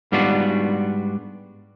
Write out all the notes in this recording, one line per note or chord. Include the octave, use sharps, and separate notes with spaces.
G#2 G3 B3 D4 F4 F#4